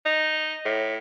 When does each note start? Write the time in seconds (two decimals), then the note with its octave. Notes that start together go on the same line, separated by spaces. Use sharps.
0.06 D#4
0.66 A2